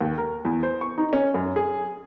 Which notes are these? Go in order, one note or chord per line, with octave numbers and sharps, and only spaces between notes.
D#2
A#4
E2
C5
C#6
D#4
C#4
F#2
G#4